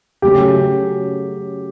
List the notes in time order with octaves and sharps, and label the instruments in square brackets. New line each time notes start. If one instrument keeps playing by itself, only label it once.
[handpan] C#3 F#3 A3 C#4 [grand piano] G4